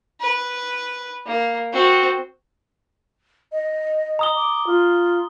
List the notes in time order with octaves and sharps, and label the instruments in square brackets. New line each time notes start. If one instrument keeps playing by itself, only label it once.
[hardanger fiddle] B4
A#3
C4 F#4
[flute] D#5
[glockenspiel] A#5 D#6 G7
[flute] D6
F4